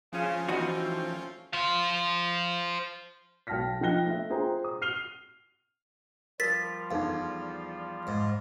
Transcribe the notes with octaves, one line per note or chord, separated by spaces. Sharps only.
C#3 F3 C#4 F4
E3 G3 A3 C4 D#4 F#4
C5 F5
B1 G5 A5 F6 A#6 B6
F3 D#4 G5 F#6 A#6 G7
A3 E5
F4 G#4 C5 G5 A#5
D#6
F6 C7 D#7 F7 G7
F3 G3 F4 A#4 A6 B6
E2 D#4 A4 F5
G#2